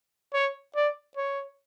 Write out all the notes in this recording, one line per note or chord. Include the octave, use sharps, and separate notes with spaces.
C#5
D5
C#5